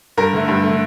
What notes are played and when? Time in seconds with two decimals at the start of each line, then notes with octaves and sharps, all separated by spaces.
0.17 G2 A#4
0.33 D3 A3
0.48 G2
0.63 A3
0.69 D3